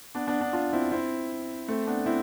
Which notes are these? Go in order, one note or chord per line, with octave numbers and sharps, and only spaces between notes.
B3 D4
B3 D4
B3 D4
D4 F4
C4 E4
C4 E4
A3 C4
B3 D4
C4 E4